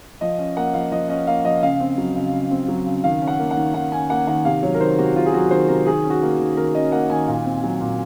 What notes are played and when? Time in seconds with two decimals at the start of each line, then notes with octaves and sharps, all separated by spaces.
0.21 F3 D#5
0.38 C#4
0.56 A#3 F#5
0.74 F3 F5
0.92 F3 D#5
1.09 C#4 D#5
1.27 A#3 F5
1.45 F3 D#5
1.62 C#3 F5
1.80 C4
1.98 F#3
2.16 C#3
2.33 C#3
2.51 C4
2.68 F#3
2.86 C#3
3.04 D#3 F5
3.22 C#4
3.27 F#5
3.39 A#3
3.51 F#5
3.57 D#3
3.74 D#3 F#5
3.92 C#4 G#5
4.10 A#3 F#5
4.27 D#3 F#5
4.45 C3 F5
4.62 F#3 C#5
4.74 A#4
4.80 D#3 C5
4.98 C3 F#4
5.16 C3 F4
5.26 G#4
5.33 F#3 F#4
5.51 D#3 C5
5.68 C3 A#4
5.86 D#3 G#4
6.04 C#4
6.10 F#4
6.22 A#3
6.39 D#3
6.57 D#3 A#4
6.75 C#4 D#5
6.92 A#3 F#5
7.10 D#3 G#5
7.28 A#2
7.45 C4
7.63 F#3
7.81 A#2